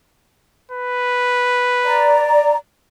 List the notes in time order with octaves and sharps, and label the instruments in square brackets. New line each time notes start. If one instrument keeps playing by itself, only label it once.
[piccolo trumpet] B4
[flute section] D5 A#5